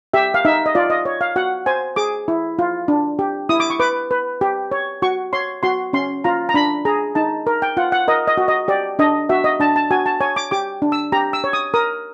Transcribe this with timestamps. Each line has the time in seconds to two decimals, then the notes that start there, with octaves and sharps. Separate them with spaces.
0.13 G4 E5
0.34 F5
0.45 D#4 E5
0.66 D#5
0.75 F4 D5
0.90 D#5
1.05 C#5
1.21 F5
1.36 F#4 F#5
1.66 C5 G#5
1.96 G#4 D6
2.28 E4
2.59 F4
2.88 D4
3.19 G4
3.49 E4 D#6
3.60 D6
3.70 C#6
3.80 B4 D6
4.11 B4
4.41 G4
4.72 C#5
5.02 F#4 C#6
5.33 C#5 C6
5.63 F#4 C6
5.93 C#4 C6
6.24 F4 A#5
6.49 A#5
6.54 D4 B5
6.85 G#4 A#5
7.15 D#4 A5
7.47 A#4
7.62 G5
7.77 F4 F#5
7.92 F#5
8.08 A#4 D#5
8.27 D#5
8.37 F#4
8.48 D#5
8.68 G4 D5
8.99 D4 D#5
9.29 F#4 E5
9.44 D#5
9.60 D4 A5
9.76 A5
9.90 F#4 G#5
10.06 A5
10.21 C#5 G#5
10.36 D6
10.51 G4 D6
10.82 D4
10.92 E6
11.12 G4 A#5
11.33 E6
11.44 C#5
11.53 D#6
11.74 A#4 D#6